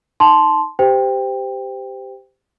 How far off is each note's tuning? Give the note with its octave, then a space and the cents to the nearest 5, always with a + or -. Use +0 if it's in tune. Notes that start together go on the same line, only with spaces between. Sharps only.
D#4 +0 A5 -10 C6 +0
G4 +0 C5 -25 G5 +15